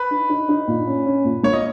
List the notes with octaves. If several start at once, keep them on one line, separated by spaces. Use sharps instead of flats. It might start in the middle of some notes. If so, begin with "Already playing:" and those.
Already playing: B4
D#4
D#4
D#4
A#2
C#4
C#4
A#2
A#3 C#5
D#5